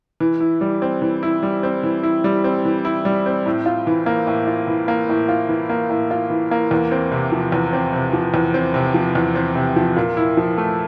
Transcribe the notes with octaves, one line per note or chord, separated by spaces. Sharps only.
E3
E4
G3
C4
E3
E4
G3
C4
E3
E4
G3
C4
E3
E4
G3
C4
A2
F4
E3
A#3
A2
F4
E3
A#3
A2
F4
E3
A#3
A2
F4
E3
A#3
E2
C4
C3
F3
E2
C4
C3
F3
E2
C4
C3
F3
E2
C4
C3
F3
A#2
E4
F3
A3